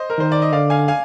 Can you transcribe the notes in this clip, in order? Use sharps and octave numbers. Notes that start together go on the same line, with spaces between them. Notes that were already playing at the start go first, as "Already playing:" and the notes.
Already playing: C5 D#5
A#4
D#3 C5
D5
D#5
D3 D5 F5
F5 G#5
F5 G#5